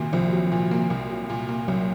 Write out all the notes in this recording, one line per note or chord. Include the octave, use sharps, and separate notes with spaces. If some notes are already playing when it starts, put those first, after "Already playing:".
Already playing: C2 A#2 D#3 F#3 A#3
C2 F3
F#3
A#2
A#3
C2
F#3
A#2
A#3
C2 F#3